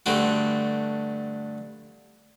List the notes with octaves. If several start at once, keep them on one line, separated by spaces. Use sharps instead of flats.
G2 D3 A3 F#4